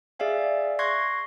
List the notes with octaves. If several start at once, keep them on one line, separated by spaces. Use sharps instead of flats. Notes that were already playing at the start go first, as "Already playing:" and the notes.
G#4 D5 E5 F5 G#5
C6 C#6 F#6 G#6 A#6 C7